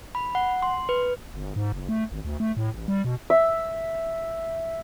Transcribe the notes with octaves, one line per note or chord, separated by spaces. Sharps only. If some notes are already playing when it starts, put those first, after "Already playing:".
B5
F#5
C6
B4
G1
G#2
F#1
A3
G#1
D2
A3
A2
A1
G3
B2
E5